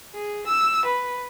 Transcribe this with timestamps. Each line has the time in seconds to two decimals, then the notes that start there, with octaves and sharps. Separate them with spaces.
0.14 G#4
0.46 E6
0.85 B4